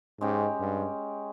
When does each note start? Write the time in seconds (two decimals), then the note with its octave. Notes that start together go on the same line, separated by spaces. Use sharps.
0.20 G#2 G#3 C#4 G4
0.59 G2